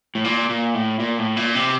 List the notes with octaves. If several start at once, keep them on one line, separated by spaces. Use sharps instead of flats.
A2
A#2
A#2
A2
A#2
A2
A#2
C3